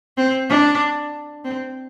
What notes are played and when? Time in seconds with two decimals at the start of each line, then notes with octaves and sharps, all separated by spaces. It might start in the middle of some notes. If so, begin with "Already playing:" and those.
0.17 C4
0.49 D4
1.44 C4